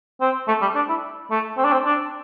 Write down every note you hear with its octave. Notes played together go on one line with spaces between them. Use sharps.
C4
A3
G3
D4
E4
A3
C4
D4
C4
D4